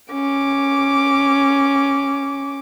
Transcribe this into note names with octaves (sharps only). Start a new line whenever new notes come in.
C#4 D6